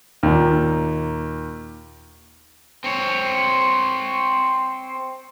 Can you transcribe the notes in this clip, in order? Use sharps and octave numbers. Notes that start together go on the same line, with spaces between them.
D#2 A#2
C4 C#5